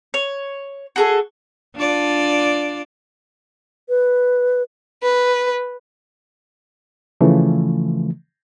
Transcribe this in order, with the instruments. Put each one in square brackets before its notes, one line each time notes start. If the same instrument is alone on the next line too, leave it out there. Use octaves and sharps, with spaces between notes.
[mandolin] C#5
F#4 G#4 A4
[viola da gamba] D4 F4 D5
[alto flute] B4
[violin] B4
[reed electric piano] C#3 E3 F3 A3